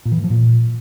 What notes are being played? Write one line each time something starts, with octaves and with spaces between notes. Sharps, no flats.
A#2
E3
A2
F3
A#2